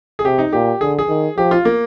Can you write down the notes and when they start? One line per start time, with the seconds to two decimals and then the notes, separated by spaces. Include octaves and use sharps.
0.19 G#4
0.25 C3 G4
0.38 D#4
0.53 A#2 G4
0.81 D3 G#4
0.99 G#4
1.09 D#3
1.37 F3 G4
1.51 F4
1.65 A#3